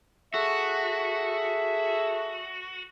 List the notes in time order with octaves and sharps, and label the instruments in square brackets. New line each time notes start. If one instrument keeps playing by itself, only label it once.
[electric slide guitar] F#4 [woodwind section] G#4 A4 E5